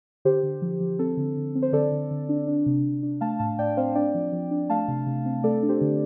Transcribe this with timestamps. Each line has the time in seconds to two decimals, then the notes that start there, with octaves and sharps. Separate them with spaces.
0.25 D3 G4 C5
0.43 D3
0.62 F3
0.80 F3
0.99 C4 A4
1.17 D3
1.37 D3
1.55 C4
1.62 C5
1.73 D3 A4 D5
1.91 D3
2.11 D3
2.29 D4
2.47 D4
2.66 C3
2.85 C3
3.03 D4
3.21 A3 F5 A5
3.39 A2 F5 A5
3.58 A2 D5 G5
3.77 C4 C5 F5
3.95 D4 D5 G5
4.14 F3
4.32 F3
4.51 D4
4.70 A3 F5 A5
4.88 C3
5.06 C3
5.25 C4
5.44 A3 A4 D5
5.63 D4
5.69 G4 C5
5.81 D3